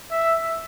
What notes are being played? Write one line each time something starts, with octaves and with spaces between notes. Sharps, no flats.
E5